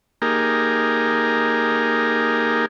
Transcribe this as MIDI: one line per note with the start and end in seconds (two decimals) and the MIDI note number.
0.22 2.66 58
0.22 2.66 63
0.22 2.66 67
0.22 2.66 68
0.22 2.66 70